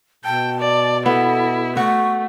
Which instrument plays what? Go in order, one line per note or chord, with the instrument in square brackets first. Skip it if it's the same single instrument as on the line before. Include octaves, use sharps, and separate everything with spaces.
[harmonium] B2 [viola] G5 [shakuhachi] A5
[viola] D5
[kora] B3 [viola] E4 [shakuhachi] A4
[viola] A3 [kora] F#4 [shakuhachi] C#6